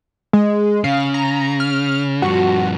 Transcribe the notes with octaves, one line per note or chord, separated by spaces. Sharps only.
G#3
C#3 F5
A#5
F6
G2 F3 F#4